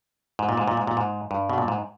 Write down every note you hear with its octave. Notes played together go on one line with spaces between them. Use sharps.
G#2
A#2
G#2
A#2
G#2
A#2
G#2
G2
B2
A#2
G#2